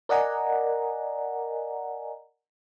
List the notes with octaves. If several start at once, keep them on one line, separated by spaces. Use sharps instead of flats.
A#4 D5 D#5 F#5 G#5 A#5